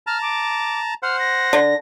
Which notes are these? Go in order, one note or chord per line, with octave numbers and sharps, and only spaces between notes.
A5 A#5 F6
D6
C5 F#5 F6
A#6
D3